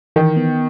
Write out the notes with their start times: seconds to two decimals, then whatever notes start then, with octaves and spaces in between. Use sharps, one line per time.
0.16 D#3 E3
0.36 B3